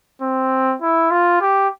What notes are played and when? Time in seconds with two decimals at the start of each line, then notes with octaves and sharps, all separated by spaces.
0.22 C4
0.82 E4
1.11 F4
1.41 G4